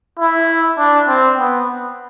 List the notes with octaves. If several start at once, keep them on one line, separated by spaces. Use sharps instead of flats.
E4
D4
C4
B3